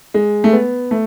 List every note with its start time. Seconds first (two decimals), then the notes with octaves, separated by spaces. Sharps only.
0.14 G#3
0.44 A3
0.53 B3
0.91 A3